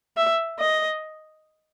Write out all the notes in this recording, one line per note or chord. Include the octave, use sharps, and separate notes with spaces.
E5
D#5